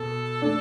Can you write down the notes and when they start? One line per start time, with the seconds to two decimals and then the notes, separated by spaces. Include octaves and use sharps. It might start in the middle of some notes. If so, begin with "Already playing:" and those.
Already playing: B2 A4
0.42 A3 D4